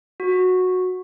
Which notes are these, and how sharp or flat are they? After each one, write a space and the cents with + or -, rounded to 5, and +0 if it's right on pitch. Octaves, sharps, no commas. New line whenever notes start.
F#4 -10